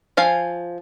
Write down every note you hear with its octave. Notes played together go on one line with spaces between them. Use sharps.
F3 F5 G#5